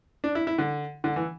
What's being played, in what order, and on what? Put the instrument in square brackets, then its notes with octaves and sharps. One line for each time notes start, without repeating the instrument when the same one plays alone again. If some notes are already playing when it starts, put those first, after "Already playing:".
[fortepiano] D4
E4
E4
D3
D3
E3